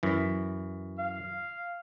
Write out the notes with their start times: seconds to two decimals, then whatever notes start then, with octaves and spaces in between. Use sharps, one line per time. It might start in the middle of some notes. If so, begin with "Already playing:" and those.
0.03 F#2 E3
0.98 F5